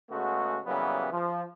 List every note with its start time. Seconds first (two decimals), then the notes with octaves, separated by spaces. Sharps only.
0.10 C#3 G#3 A3 B3 F#4
0.66 C#3 E3 F#3 G3 A#3 B3
1.11 F3